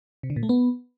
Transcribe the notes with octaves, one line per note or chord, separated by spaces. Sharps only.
C3
D3
A#2
A3
B3